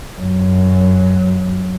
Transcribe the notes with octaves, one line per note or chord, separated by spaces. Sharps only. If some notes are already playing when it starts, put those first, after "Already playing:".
F#2 F#3